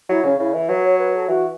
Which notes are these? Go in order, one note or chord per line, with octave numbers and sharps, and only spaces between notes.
F#3 E4
C#3 C#4
C#3 E4
E3
F#3 B4
C#5
B4
A4
E3 F#4